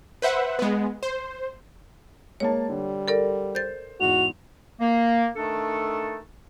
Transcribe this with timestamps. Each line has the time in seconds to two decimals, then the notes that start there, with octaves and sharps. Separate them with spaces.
0.22 B4 C5 E5 F#5
0.59 G#3 B3
1.03 C5
2.40 G#3 A#3 C#5 A5
2.69 D3 G3
3.08 A4 A#4 D5
3.55 C5 G6 A6
4.00 E2 G#2 F#4 F7
4.80 A#3
5.36 D#3 A3 D4 A4